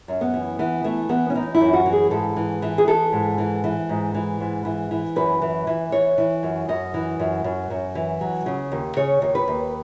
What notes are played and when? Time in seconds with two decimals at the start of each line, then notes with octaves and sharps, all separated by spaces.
0.08 F#2
0.21 B3
0.34 E3
0.59 E3 B3
0.84 E3 A3
1.09 E3 B3
1.30 C#4
1.35 E3 D#4
1.55 E4
1.61 F#2
1.73 F#4
1.86 E3
1.93 G#4
2.11 G#2 A4
2.36 E3
2.62 E3
2.78 G#4
2.87 E3 A4
3.13 G#2
3.38 E3
3.64 E3
3.89 G#2
4.15 E3
4.40 G#2
4.65 E3
4.91 E3
5.16 F#2 B4
5.42 E3
5.67 E3
5.92 E3 C#5
6.18 E3
6.43 F#2
6.69 F#2 D#5
6.94 E3
7.19 F#2
7.44 F#2
7.70 F#2
7.95 E3
8.21 F#3
8.46 C#3
8.72 D#2
8.96 C#3 C#5
9.22 D#2
9.35 B4
9.48 D#2